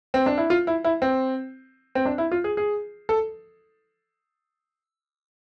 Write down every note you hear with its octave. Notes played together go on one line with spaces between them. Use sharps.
C4
D4
E4
F4
E4
E4
C4
C4
D4
E4
F4
G#4
G#4
A4